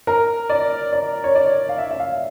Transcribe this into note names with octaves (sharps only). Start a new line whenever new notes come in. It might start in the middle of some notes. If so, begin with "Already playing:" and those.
A#4
D5
D5
C#5
D5
F5
E5
E5
F5